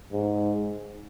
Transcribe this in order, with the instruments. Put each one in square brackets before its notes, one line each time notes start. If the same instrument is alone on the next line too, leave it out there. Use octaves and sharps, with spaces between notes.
[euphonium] G#2